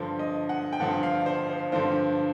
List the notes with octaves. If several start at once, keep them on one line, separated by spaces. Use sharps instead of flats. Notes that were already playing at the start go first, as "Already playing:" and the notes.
Already playing: G2 D3 F3
D#5
F#5
G5
G2 D3 F3 F#5
F5
C5
C5
G2 D3 F3 C5